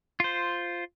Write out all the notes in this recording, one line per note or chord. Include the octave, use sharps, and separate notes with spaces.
F4 C5